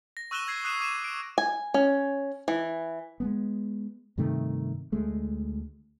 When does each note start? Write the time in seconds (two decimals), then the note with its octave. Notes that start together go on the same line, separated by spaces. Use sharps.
0.17 A#6
0.31 C#6 E6 F#6 D#7 E7 G7
0.47 E6 G#6 C7
0.64 D#6 F#6 C7 D#7 E7
0.80 D6 D#7 E7
1.04 D7
1.38 G#5
1.74 C#4
2.48 E3
3.20 G#3 A3 B3
4.18 G2 C3 D#3 A3
4.92 D2 G#3 A3